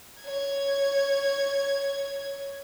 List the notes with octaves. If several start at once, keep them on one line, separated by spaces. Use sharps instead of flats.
C#5 G#6